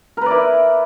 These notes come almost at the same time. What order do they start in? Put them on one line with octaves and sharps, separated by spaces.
A#4 B4 D5 E4